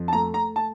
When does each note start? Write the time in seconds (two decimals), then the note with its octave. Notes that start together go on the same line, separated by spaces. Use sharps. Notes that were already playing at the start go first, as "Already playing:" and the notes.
Already playing: F2
0.08 A5
0.13 A3 A#5
0.34 A#5
0.56 A5